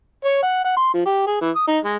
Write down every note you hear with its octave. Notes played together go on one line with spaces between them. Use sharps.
C#5
F#5
F#5
C6
F3
G4
G#4
E3
D#6
D#4
G#3